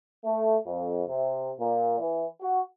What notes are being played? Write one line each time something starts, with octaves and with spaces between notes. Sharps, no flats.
A3
F2
C3
A#2
E3
F#4